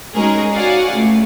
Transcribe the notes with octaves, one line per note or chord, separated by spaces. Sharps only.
G#3 C#4 D#4 F#4 G#4 A#4
F#4 C#5 D5 F5 F#5 G#5
C#2 A3